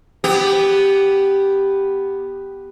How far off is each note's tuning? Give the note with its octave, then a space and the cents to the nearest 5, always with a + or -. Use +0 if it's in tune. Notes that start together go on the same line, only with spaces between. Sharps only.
B3 +0 G4 +0